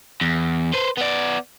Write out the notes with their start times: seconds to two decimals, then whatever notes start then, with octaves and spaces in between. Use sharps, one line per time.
0.21 E2
0.74 B4 C5
0.98 B3 D5